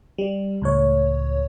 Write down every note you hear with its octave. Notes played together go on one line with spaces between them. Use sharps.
G3
C#2 A2 C#5